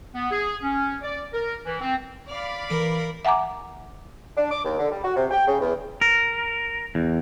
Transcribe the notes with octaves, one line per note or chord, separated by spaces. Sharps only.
B3
G#4
C#4
D5
A#4
E3
C4
D5 F5 B5
E3 A#4 D7
E5 F#5 G#5 A#5 D6
D4
D6
D#2
D3
G3
F#4
C3
G5
C#3
E2
A#4
E2